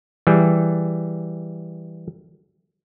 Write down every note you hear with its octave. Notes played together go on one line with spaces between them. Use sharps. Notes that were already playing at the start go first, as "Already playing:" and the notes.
E3 G3 G#4